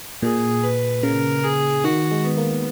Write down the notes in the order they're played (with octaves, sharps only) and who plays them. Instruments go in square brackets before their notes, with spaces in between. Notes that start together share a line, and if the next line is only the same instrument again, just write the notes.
[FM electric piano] A#2 [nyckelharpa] G#4
[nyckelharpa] B4
[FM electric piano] C#3 [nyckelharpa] A#4
[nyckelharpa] G#4
[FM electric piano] D#3 [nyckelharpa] F#4
[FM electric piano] G#3
[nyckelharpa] B3
[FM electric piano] A#3